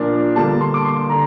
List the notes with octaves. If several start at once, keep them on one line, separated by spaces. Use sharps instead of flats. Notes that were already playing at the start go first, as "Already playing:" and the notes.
Already playing: A#2 F3 A#3 D4
D3 G3 A#3 A5
C6
D6
C6
D3 A#5